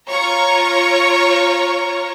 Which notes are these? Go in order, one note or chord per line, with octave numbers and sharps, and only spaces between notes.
F4 C#5 A#5 C#6